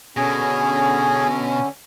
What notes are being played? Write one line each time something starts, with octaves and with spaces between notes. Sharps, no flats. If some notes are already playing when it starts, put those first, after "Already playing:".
B2 D3 C#4 G#4